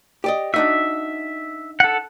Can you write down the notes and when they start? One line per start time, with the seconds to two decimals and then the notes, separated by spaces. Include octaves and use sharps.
0.24 G4 D5 D#5
0.54 D4 D#4 F#4 E5
1.80 A4 F#5